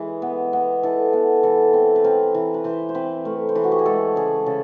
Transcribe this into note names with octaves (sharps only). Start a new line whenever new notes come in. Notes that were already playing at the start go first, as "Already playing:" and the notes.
Already playing: E3 G#3
B3
B3
E3 A4
B3
E3 A4
C4
B4
C4 A#4
E3
B4
E3 C5
C5
C4 B4
A3 A#4
C5
E3 B4
F#4
G4
G#4
G#3 A4
C#3 G#4
C#3 A4